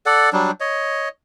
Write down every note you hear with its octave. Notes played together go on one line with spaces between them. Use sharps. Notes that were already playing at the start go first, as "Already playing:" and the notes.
A4 D5 F#5
F#3 G3 D4
C#5 D#5